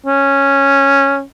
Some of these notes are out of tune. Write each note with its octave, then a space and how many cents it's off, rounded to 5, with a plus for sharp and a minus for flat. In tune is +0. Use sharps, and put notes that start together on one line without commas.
C#4 -5